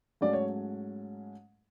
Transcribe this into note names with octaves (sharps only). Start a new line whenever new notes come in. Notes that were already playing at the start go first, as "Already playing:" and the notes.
G#2 F#3 A3 C#4 D5
C#5